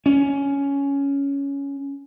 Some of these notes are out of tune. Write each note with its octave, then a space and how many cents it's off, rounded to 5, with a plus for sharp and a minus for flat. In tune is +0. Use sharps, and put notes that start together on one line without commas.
C#4 +10